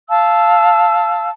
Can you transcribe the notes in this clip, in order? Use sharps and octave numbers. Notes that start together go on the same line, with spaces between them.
F5 A5 E6